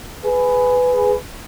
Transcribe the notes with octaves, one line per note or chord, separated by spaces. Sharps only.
G#4 B4